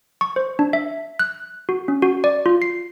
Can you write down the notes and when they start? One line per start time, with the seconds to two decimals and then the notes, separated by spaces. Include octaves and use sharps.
0.21 C#6
0.36 C5
0.59 D4
0.73 E5
1.19 F#6
1.69 F#4
1.88 C#4
2.02 F#4
2.24 D5
2.46 F4
2.62 C7